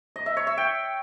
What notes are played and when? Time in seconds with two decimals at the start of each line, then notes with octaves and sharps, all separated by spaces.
0.16 D#5
0.26 E5
0.37 C#5
0.47 E5
0.58 G5